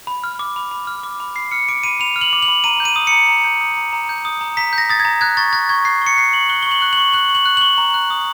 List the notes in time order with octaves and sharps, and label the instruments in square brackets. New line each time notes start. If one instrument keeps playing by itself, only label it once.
[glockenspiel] B5
F6
D6
B5
B5
F6
D6
B5
B5 C7
F6 C#7
D6 D7
B5 D#7
B5 F7
F6
F#7
D6
F#7
B5
A#5 D#7
G6
D#7
D#6
C#7
A#5
A#5
G6
D#6
A#5
A#5
G6
D#6
A#5
A#5 B6
G6
A#6
D#6 A6
G#6
A#5
F#6 G#6
C#6 A6
F#6 A6
C#6 G#6
F#6 C7
C#6 C#7
F#6 C7
C#6 F#7
F#6 G7
C#6 G7
F#7
F#6
C#6 F#7
F#6 F#7
C#6
F#7
F#6
C#6 F#7
A#5
F#6
D#6